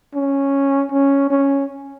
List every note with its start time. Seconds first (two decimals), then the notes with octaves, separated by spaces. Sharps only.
0.15 C#4
0.92 C#4
1.31 C#4